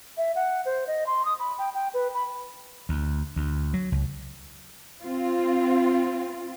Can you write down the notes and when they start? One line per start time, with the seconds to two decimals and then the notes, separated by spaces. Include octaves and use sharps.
0.18 E5
0.36 F#5
0.66 C5
0.87 D#5
1.07 C6
1.25 D#6
1.40 B5
1.58 G5
1.75 G5
1.94 B4
2.14 B5
2.89 D2
3.36 D2
3.74 F#3
3.92 C#2
5.02 C4 F4